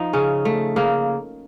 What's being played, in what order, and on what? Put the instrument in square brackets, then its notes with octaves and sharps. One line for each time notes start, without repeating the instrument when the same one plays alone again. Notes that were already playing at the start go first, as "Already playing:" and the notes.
Already playing: [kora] F3 D#4
C#3 C#4
A3
C#3 A#3